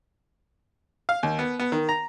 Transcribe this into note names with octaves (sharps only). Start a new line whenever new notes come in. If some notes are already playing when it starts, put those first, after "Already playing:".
F5
D#2
B3
B3
D#3
A#5